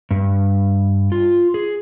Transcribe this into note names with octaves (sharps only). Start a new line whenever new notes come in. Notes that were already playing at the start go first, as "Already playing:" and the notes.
G2
F4
G#4